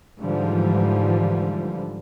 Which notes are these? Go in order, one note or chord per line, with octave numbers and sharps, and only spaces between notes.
G#2 D3 E3 F3 G3